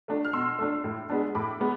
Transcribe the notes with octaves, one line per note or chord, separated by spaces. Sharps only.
A3 D4
F6
B2 C6 E6
A3 D4
A2
G#3 B3 D4
A2 B5 D6
G#3 B3